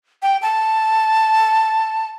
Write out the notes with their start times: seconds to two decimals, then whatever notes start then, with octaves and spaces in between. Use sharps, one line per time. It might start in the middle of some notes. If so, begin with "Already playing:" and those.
0.22 G5
0.42 A5